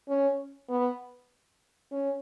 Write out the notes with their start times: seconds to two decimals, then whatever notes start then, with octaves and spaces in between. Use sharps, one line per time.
0.09 C#4
0.69 B3
1.91 C#4